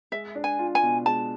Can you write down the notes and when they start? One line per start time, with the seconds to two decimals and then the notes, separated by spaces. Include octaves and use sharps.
0.12 G#3 E5
0.35 D4
0.44 G#5
0.59 F4
0.75 G#5
0.83 B2
1.06 G#3 A5